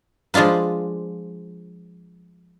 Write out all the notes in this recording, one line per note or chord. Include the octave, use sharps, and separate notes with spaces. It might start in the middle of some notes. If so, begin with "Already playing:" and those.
F3 G#3 D4 F4 B4